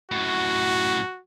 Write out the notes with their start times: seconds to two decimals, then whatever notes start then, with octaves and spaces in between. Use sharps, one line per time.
0.12 F#2 A2 F#4